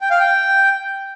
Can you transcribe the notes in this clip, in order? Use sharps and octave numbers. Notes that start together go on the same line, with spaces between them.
G5
F5
G5